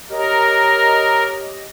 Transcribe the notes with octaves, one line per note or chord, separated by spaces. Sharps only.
G4 A#4 C#5 D#5